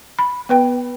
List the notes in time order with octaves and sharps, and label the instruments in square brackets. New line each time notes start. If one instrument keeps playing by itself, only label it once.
[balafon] B5
B3 B4 G5